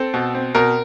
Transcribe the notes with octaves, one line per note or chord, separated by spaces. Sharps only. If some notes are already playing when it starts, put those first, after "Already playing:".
Already playing: C4 A4
B2
C4
B2 A#4